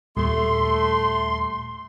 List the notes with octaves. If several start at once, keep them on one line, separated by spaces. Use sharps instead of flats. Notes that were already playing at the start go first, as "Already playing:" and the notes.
D#2 A#2 G3 A3 C6